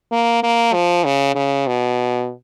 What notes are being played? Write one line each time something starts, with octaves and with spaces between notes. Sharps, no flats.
A#3
A#3
F3
C#3
C#3
B2